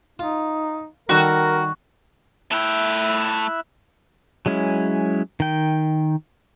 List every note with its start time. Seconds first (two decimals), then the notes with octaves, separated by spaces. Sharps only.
0.19 D#4 F4
1.09 D#3 G3 F#4 A4 A#4
2.52 A3 E4 E5 G5 F#6
4.46 F#3 G#3 C#4 E4
5.40 D#3 G5